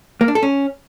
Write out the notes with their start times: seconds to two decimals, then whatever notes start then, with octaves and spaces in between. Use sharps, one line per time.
0.21 A#3
0.28 D4
0.35 A4
0.43 C#4